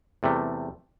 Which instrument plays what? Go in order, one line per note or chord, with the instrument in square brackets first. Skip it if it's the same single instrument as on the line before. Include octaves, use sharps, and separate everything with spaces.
[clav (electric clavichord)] E2 C3 G3 A3